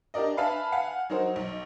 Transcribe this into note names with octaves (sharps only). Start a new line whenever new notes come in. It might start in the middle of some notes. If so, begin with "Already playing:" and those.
D4 G4 A#4 D5 D#5
B4 E5 F5 G#5 A5 B5
F5 F#5 G#5
F#3 D#4 A#4 C5
B1